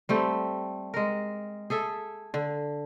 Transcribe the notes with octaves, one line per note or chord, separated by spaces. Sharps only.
G3 A3 C4
G#3 A#4
G#4 A4 E5
D3